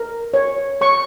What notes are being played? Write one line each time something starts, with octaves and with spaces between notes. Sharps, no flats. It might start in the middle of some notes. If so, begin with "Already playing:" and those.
Already playing: A#4
C#5
C#5 C#6